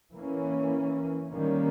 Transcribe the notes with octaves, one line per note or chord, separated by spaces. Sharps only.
E3 A#3 C#4
D#3 G3 A#3 C#4